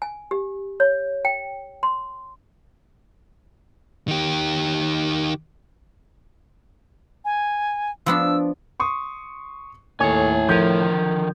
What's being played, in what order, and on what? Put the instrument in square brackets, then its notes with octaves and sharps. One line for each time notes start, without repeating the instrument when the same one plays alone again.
[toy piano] G#5
G4
C#5
G5
C6
[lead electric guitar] D#3 G4
[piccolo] G#5
[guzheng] F3 B3 D4 [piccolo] E6
[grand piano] C6 C#6 D#6
[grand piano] D#2 [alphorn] A2 [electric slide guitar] A4 G#5 [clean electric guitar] C#5
[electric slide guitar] D3 D#3 A#4 [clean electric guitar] F3 [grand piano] G6 G#6